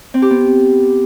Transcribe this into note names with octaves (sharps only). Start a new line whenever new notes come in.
C4
G4
B3